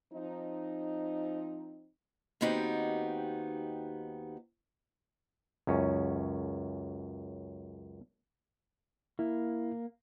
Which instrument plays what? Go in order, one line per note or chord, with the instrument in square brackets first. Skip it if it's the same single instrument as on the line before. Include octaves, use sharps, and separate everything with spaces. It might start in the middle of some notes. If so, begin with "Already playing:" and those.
[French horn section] F3 C4 D#4
[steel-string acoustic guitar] D#2 B3 C4 D#4 F#4 G4
[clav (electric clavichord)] C#2 F#2 C#4
[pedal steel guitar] A#3 [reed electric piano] E4